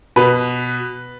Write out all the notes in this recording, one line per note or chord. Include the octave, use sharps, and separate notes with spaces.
B2 B4